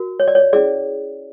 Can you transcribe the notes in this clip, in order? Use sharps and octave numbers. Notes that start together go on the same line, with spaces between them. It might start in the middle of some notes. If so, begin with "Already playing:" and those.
Already playing: F#4 A#4
C#5
D5
C#5
C#4 E4 G#4 D5